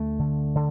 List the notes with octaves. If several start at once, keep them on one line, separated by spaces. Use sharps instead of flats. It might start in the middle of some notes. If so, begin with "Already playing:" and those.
Already playing: D2 A3
D3
D3